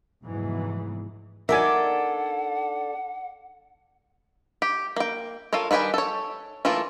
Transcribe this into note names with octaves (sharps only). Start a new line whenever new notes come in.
F1 E2 G#2 E3 F#3 G#3
D4 D#4 A4 A#4 D5 E5 F#5 G#5
G4
A#3 G5
F4 A4 A#4 C#5
D#3 G3 B4 G5 G#5
A4 C#5
E3 A3 A#3 F4 A4